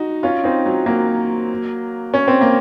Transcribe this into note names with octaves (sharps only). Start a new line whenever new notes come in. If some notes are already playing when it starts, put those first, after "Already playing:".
Already playing: D#4 F#4
C#4 F4
C4 D#4
F#3
F#3 A#3
C#4
C4
A#3